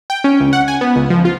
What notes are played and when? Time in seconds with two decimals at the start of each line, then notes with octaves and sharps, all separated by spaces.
0.10 G5
0.24 C#4
0.40 C#2
0.53 F#5
0.68 G#5
0.81 B3
0.96 C#2
1.10 F3
1.25 F4